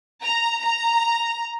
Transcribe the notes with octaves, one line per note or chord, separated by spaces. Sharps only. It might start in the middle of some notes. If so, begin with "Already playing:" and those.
A#5
A#5